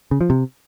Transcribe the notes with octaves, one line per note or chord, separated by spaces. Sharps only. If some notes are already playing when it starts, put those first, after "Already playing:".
C#3
F3
C3